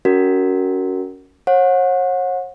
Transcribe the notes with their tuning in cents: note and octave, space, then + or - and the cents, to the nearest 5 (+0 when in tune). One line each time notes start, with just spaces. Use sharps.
C#4 +25 F#4 +15 A#4 -10
C#5 -40 F#5 -30